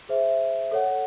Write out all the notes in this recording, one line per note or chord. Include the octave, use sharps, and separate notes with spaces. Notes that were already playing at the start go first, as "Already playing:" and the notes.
G#4 C5 E5
A4 C#5 F#5